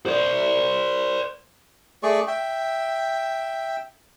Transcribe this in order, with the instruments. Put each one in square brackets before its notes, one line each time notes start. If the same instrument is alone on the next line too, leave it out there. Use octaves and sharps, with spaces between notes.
[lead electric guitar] C5 D5
[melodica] A3 G#4 D5 C#6
E5 G5